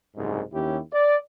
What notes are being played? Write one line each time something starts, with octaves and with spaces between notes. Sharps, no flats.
F#1 C2 G#2
D#2 C#4 E4 G4
D5